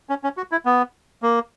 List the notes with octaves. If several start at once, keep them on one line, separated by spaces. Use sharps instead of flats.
C#4
C#4
F#4
E4
B3
A#3